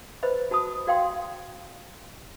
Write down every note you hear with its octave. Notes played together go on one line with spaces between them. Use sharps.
B4 C5 D#5 B5
F#4 A5 B5 D#6
F#4 D5 F5 G5 C6